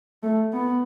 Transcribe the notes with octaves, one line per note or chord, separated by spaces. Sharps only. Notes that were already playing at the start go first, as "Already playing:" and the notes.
A3
B3